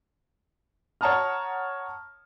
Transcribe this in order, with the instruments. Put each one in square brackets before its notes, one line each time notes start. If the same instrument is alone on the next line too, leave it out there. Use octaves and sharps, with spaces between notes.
[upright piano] C#5 F#5 A5 A#5 D#6 F6